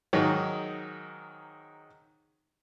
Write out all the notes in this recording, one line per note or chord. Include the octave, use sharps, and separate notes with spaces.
G#2 D#3 F#3